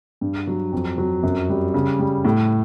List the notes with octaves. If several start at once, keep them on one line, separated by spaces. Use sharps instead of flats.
G2
F#3
F2
F#3
F#2
G3
C#3
G3
A2